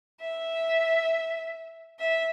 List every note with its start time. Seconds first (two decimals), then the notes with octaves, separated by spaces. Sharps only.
0.21 E5
1.99 E5